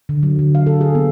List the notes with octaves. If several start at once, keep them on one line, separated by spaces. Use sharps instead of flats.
D3
F#3
D3
F5
A4
G#4
B3